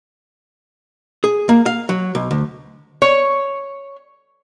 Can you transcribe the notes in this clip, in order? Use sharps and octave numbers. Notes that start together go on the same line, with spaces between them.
G#4
A#3
F5
F#3
B1
D2
C#5